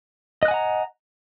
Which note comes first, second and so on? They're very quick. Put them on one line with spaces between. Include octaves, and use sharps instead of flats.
D#5 F#6 G#5 F#5 A#5